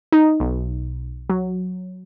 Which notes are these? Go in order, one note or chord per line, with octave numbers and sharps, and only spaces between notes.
D#4
B1
F#3